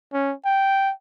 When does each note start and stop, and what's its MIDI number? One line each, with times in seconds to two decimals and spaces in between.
0.13 0.33 61
0.46 0.92 79